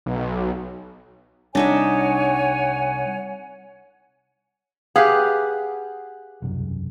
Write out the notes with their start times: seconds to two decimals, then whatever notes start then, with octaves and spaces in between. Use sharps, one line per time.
0.06 B1
1.55 C2 D4 D#4 C#5 E5 F#5 G#5
4.96 G4 G#4 B4 F5 F#5
6.42 E1 C2 F#2